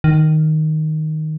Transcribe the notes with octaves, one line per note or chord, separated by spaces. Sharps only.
D#3